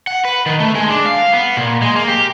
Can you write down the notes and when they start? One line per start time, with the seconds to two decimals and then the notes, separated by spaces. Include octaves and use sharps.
0.07 F#5
0.25 B4
0.46 D#3
0.60 A3
0.75 G#3
0.90 D4
1.06 F5
1.33 B3
1.57 A#2
1.82 G#3
1.96 A#3
2.08 G4